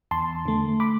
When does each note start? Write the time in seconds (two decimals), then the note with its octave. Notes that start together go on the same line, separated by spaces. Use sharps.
0.11 E2 A5 C6
0.46 D3 A3
0.80 B5 D6